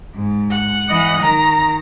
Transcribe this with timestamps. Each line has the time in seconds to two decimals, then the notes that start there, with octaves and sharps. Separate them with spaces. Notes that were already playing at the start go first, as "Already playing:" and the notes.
0.15 G#2
0.51 F#5
0.89 E3 D#5
1.22 D#3 A#5